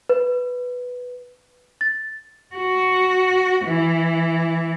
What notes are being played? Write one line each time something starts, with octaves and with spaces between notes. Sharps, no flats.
B4
A6
F#4
E3